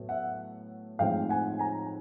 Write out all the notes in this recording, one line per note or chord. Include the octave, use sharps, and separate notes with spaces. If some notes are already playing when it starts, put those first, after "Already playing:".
Already playing: A2 F#3 B3
E5 F#5
A2 F3 G#3 C4 D#4 F5 G5
F#5 G#5
G#5 A#5